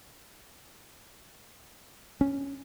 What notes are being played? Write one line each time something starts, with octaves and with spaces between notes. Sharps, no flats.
C#4